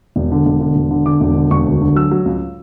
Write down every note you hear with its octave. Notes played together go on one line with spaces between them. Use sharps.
E1
D3
E1
D3
E1
D3
D3 D6
E1
D3
E1 C#6
D2
D3
F#3 E6
F#3
C#2